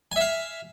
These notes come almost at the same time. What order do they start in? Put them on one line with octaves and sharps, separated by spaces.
G#5 E5 F5